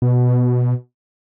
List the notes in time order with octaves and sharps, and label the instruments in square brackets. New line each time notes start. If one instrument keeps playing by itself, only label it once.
[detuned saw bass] B2